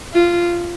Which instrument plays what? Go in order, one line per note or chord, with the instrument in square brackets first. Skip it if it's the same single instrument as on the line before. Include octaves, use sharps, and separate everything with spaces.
[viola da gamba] F4